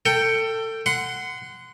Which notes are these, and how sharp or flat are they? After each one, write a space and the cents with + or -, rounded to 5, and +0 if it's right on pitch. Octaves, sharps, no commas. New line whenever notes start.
A4 +25 G5 +0
F#5 +0 C6 -30